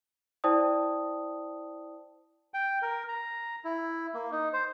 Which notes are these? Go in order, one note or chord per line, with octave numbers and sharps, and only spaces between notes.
E4 C5 D5 G5 A5 D#6
G5
A#4
A#5
E4
A#3
D#4
C5